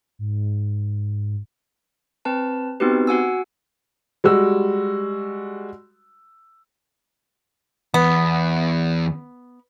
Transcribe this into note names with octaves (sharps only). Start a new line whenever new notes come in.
G#2
C4 B4 A5
B3 C4 D#4 F#4 G4 B4
F#4 F#5 G#5 E6
G3 G#3 F#4 E6
E2 B3